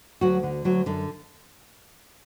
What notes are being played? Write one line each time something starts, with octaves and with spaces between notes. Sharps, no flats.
D2 F#3 F#4
D3
D2 F#3 F#4
F#2 D3 D4